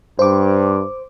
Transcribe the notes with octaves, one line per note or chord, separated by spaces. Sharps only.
G2 C5 D6